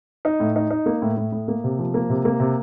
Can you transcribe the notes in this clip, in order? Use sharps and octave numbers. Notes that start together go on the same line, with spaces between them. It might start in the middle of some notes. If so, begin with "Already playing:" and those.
D#4
A2
D#4
D#4
A#3
A2
A2
A2
A#3
C3
F3
A#3
C3
A#3
C3